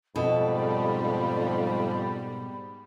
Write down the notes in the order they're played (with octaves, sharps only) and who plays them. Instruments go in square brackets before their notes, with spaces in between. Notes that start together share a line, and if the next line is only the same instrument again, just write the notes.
[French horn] F2 [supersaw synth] G#2 G3 [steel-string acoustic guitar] B2 A4 [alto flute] B5